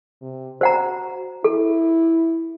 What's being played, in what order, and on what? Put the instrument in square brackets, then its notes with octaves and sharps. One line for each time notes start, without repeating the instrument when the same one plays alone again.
[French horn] C3
[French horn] F#4 [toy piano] C5 F#5 A#5
[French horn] E4 [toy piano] A4